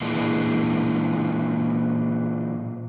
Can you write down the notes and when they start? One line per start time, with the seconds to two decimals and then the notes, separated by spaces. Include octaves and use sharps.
0.01 A#2 E3 G#3 D4